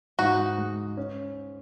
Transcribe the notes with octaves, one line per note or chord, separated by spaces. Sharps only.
G#2 D#4 F#4
G#3
C#4